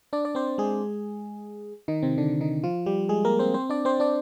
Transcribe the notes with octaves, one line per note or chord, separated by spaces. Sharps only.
D4 D5
D5
C4 C5
G#3 G#4
D#3 D#4
C3 C4
D3 D4
D#3 D#4
F3 F4
G3 G4
G#3 G#4
A#3 A#4
C4 C5
C4 C5
D4 D5
C4 C5
D4 D5